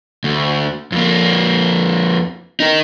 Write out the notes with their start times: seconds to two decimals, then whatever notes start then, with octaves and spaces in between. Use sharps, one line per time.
0.24 D2
0.92 F2 A#3
2.60 D#4 A#4